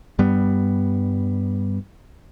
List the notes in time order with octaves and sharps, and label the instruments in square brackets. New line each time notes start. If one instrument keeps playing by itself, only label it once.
[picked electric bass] G2 G3 B3